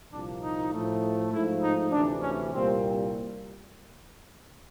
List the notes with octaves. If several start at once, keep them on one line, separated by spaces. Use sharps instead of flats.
C2 A#2 F3 A#3 D4
D#4
A2 F3 A3
G#2 F3 A3 E4
D#4
D2 C3 E3 D4
C#4
C2 A#2 G3 A#3 C4